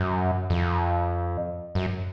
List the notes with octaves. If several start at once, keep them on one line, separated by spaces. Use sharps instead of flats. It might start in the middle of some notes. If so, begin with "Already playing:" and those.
Already playing: F#2
F2
F#2